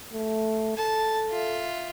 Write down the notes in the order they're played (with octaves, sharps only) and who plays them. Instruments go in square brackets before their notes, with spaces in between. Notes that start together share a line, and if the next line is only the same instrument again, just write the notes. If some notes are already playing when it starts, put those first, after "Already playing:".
[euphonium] A3
[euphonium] A4 [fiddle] A5
[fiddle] F4 E5